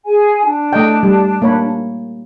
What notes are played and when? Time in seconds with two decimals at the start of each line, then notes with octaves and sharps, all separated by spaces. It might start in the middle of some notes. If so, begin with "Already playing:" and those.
0.05 G#4 G#5
0.44 D4
0.73 A3 D#5 G5
1.03 G3
1.42 A#3 C#5 B5